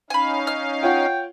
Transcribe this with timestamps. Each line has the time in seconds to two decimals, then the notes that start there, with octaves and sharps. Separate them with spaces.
0.10 C#4 D#4 F5 G#5 B5
0.47 F6
0.83 F4 C#5 F#5 G5